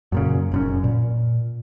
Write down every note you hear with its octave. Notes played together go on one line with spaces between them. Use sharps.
F#2 A#2 C#3
F1 F#2 C#4
A#2